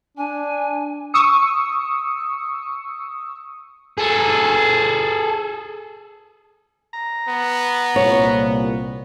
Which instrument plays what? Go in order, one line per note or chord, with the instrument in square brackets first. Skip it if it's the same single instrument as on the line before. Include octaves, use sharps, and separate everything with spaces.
[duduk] D4 [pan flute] G#5
[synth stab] C#6 D#6 E6 C#7
[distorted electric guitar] G#4 A4
[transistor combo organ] A#5
[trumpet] B3
[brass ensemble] C2 A#2 [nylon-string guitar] C#5